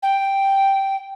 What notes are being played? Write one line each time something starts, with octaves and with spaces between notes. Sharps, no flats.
G5